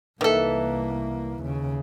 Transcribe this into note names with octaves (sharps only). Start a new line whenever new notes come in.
C2 D#3 E3 A#3 A4
D#2 C#3